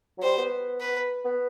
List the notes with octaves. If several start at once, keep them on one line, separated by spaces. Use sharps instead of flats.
F#3
G3 C5
B3
B4
B3